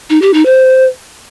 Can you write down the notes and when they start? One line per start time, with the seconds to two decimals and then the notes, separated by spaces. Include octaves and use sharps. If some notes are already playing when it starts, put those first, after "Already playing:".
0.10 D#4
0.22 G4
0.34 D#4
0.46 C5